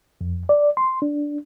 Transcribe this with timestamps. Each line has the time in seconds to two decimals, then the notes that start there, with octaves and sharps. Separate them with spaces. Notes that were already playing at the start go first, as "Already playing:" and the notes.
0.21 F2
0.49 D5
0.77 C6
1.02 D4